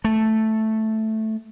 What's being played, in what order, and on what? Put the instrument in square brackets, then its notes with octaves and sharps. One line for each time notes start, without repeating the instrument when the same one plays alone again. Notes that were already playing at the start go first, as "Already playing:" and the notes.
[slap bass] A3